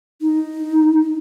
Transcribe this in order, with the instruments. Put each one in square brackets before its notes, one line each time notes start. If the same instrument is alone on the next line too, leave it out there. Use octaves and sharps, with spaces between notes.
[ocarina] D#4